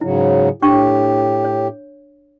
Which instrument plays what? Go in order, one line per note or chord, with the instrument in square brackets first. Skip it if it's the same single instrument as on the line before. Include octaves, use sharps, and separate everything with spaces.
[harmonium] G#2 C#3 F#3 [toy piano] E4
[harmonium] A2 G4 [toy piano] D4 G5 C#6
[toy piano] C#5